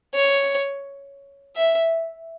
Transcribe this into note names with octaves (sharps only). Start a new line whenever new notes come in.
C#5
E5